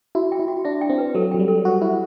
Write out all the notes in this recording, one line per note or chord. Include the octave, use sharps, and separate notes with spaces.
E4 F#4
G5
E4
F#4
D4 E5
G5
C4
B4
F#3 A4
F#3 G5
G3
A4
F#4 C5
E4 C5